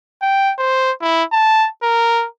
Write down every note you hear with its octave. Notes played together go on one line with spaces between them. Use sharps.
G5
C5
E4
A5
A#4